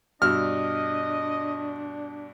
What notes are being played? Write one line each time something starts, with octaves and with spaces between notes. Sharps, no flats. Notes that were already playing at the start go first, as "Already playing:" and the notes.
G2 B2 D4 D#5 E6 F6